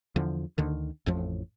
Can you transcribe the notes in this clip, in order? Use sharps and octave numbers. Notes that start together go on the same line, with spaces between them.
E2 D3 F3
D2 D3 D#3
A1 F2 A2 F3